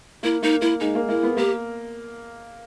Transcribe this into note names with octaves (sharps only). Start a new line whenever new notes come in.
A#3 E4
A#3 D#4
A#3 E4
G#3 D#4
A#3
A#3 E4
B3
A#3 G4